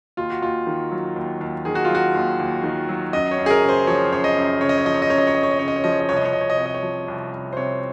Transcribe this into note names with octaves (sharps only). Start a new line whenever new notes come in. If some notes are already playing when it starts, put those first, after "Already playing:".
D#2 F4
F#4
D#2 F4
D#3
F#3
D#2
D#2
D#3 G#4
F#4
F4
F#3 F#4
D#2
D#2
D#3
F#3
F#2 D#5
C#5
F#2
G#4
A#4
C#3
C5
F3 C#5
F#2 C#5
D#5
F#2
C#3 C#5
D#5
C#5
F3 D#5
C#5
D#5
F#2 C#5
D#5
C#5
F#2 D#5
C#5
D#5
C#3 C#5
D#5
C#5
F3 D#5
C#5
D#5
C2 C#5
D#5
C#5
C2 D#5
C#5
D#5
C3 C#5
D#5
C#5
F3
C2
C2
C5
C3 C#5